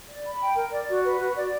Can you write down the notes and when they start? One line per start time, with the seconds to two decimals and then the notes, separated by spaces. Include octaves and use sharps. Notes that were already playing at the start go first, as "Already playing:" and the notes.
0.09 D5
0.25 B5
0.40 G5
0.56 A#4
0.72 D5
0.88 F#4
1.05 B4
1.21 F#4
1.36 D5